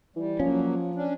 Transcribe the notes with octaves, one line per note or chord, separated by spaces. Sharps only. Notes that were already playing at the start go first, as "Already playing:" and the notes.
E3 G3
F3 F#3 A#3 C#4
C#4 D4